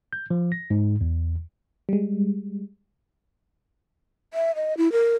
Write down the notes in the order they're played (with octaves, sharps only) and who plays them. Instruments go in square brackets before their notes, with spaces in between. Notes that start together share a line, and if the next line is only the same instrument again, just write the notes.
[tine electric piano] G6
F3
A#6
G#2
E2
[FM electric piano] G3 G#3
[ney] E5
D#5
E4
A#4